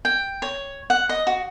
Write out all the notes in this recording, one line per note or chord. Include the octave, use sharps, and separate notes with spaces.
G5
C#5
F#5
D#5
F#4